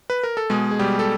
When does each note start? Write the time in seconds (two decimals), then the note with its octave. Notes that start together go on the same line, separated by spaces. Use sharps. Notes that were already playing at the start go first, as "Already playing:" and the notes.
0.10 B4
0.23 A#4
0.37 A4
0.50 B2 G#3 G#4
0.71 G#4
0.79 B2 G3 G4
0.99 A4